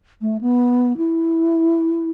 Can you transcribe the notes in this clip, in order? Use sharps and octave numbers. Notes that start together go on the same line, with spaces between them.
A3
B3
E4